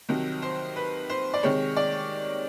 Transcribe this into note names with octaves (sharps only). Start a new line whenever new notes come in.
C2 C3 D#3 F#3
C5
B4
C5
D5
C3 D#3 G#3 C#5
D5